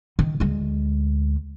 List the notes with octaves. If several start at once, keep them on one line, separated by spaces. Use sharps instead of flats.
D#3
D2 G#3